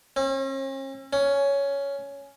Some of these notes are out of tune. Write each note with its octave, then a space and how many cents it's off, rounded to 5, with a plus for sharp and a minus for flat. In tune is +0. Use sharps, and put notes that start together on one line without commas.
C#4 -45
C#4 +10